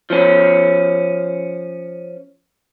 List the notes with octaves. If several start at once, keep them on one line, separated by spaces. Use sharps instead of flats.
F3 C#4